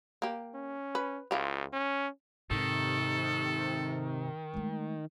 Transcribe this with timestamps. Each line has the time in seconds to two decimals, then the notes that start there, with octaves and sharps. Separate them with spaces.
0.22 A#3 G4
0.54 C#4
0.95 B4
1.31 C#2 E4 F4 G4
1.73 C#4
2.51 G#2 C3 D#3 A4
4.54 G#3 A3